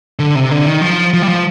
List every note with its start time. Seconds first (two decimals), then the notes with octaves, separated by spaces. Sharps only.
0.19 D3
0.36 C3
0.51 D3
0.66 D#3
0.82 F3
1.14 F3
1.22 G3
1.29 F3